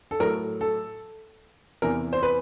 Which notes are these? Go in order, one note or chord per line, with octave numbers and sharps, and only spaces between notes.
A4
A2 F#3 A3 A#4
A4
E2 C3 E3 A#4
C5
B4